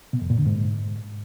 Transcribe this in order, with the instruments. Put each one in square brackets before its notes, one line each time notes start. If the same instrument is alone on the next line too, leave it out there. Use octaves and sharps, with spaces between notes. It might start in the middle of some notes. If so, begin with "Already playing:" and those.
[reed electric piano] B2
F2
A#2
D3
G#2